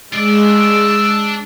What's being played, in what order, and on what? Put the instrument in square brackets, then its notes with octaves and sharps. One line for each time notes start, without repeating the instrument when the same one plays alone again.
[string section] G#3 [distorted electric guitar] D4 D5 [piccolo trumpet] E6